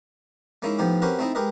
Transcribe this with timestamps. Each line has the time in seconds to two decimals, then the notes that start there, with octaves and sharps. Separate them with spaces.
0.62 G#3 A#3 C#4 D#4 E4
0.79 A2 F3 B3 D#4 G4
1.02 C4 C#4 F#4 G4 A#4 B4
1.19 A3 C4 D#4 E4 D#5
1.35 G#3 G4 A#4 B4 D#5